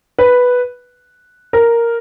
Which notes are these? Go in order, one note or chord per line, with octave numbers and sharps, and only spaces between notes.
B4
A#4